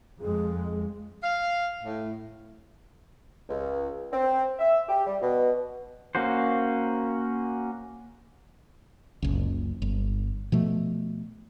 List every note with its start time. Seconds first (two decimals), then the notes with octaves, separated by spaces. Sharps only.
0.20 F2 G#3 G#4
1.23 F5
1.83 A2
3.49 C#2
4.12 C4
4.59 E5
4.88 G4
5.06 G3
5.21 B2
6.15 A#3 C#4 F#4 C5
9.22 F#1 C#2
9.82 G1
10.52 B2 F3 A3